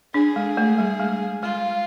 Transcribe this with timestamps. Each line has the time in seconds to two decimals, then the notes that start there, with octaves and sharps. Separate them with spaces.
0.14 D4 G#4
0.36 G#3
0.57 A3
0.78 G3
1.00 G#3
1.43 G#3 F4